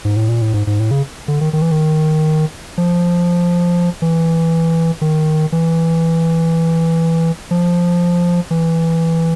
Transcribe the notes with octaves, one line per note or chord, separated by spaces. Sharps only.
G#2
A2
A#2
A2
G#2
G#2
A2
C#3
D3
D#3
D#3
E3
D#3
F3
E3
D#3
E3
F3
E3